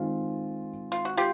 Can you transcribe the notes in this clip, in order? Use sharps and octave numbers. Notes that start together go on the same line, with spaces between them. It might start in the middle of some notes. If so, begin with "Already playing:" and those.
Already playing: D#3 G#3 C4 F4
F4
F#4
F4 G4